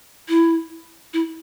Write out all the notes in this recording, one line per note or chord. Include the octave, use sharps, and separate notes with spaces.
E4
E4